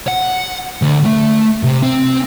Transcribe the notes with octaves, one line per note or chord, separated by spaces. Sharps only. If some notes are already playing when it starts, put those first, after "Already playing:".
F#5
D2
A3
C3
C4